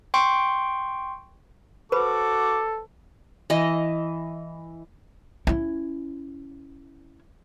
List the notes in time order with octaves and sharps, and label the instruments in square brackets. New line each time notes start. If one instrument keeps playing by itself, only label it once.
[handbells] G5 C6 C#6
[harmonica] F#4 D6 [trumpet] A4 [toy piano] B4 C5 B5
[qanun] E3 D#5
[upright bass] C#4 E4